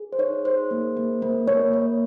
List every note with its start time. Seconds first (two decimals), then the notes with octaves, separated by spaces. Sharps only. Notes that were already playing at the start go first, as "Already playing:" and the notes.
Already playing: G#4
0.13 C5
0.19 D#4 C#5
0.44 G#4 C5
0.71 A#3
0.97 A#3
1.22 A#3
1.48 A#3 C#5
1.73 A#3